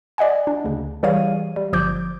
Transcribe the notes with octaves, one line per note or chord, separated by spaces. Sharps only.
D5 D#5 F#5 G#5
D4
D2 C#3
E3 G3 G#4 C#5 F5 D#7
G3
G1 F3 D6 G6